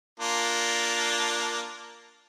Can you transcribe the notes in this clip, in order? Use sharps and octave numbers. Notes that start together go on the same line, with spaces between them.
A#3 D4 F4